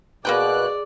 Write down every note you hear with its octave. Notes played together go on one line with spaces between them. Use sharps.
B2 A#3 G#4 B4 D5 G5 F#6